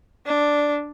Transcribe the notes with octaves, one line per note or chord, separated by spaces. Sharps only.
D4